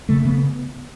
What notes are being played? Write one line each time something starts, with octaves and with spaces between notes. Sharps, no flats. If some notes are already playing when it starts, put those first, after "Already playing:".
C#3 A3
C#3 B3